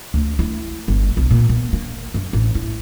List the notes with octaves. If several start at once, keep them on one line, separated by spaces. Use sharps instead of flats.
D2
E4
G1
B1
A#2
B3
A#3
F#2
A1
E4